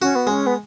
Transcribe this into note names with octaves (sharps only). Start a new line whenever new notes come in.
C#4 F#4
B3
G#3 C#4
B3